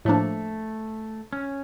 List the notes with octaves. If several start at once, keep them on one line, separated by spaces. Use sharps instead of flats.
A2 F3 A3 A#3 D4
C#4